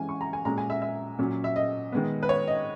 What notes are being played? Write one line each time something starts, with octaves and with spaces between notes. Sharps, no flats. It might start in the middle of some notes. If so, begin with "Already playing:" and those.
Already playing: E3 G#3 C#4 G#5
C#6
A#5
G#5
A#2 G#3 C#4 A#5
G#5
E5
E5
A#2 F#3 C#4
E5
D#5
D#3 G#3 B3
B4
C#5
D#5